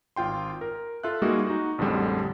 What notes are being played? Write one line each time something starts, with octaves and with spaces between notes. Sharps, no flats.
G#1 F4 G5 C6
A#4
F4 A4 E5 F#6
G3 G#3 A#3 D#4 F#4 G#4
D#4 F#4
A1 F2 D3 G3 G#3